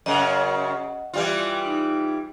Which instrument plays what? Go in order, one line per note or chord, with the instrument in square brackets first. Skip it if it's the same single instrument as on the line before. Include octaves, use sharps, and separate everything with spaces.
[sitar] F#2 C#3 [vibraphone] D#5 F#5
[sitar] E3 G3 F4
[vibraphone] D#4